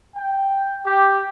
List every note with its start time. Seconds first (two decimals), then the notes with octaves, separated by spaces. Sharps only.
0.16 G5
0.86 G4